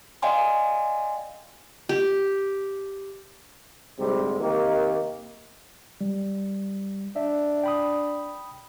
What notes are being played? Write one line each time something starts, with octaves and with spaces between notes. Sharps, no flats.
D5 D#5 F5 G5 G#5 C6
G4
D2 G#2 C3 G3
C3 D#3 A#3 G4 A#4
G3
D4 E5
G5 B5 D#6